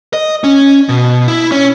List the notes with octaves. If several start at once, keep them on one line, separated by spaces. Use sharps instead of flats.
D#5
C#4
B2
E4
C#4